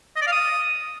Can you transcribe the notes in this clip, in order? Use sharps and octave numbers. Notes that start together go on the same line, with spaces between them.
D#5
D5
F5
D#6